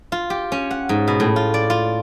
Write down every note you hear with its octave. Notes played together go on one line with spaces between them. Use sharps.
F4
G4
C#4
F#5
G#2
B2
A2
F4
D5
F4